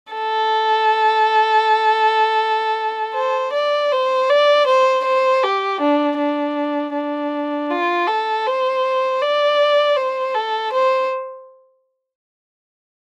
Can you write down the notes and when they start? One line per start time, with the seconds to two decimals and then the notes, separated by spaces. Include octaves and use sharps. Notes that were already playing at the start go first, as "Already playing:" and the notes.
0.13 A4
3.15 C5
3.53 D5
3.92 C5
4.30 D5
4.67 C5
5.05 C5
5.43 G4
5.81 D4
6.18 D4
6.94 D4
7.70 F4
8.07 A4
8.46 C5
9.22 D5
9.96 C5
10.34 A4
10.73 C5